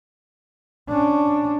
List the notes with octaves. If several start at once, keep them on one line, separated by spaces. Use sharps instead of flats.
C#4 D4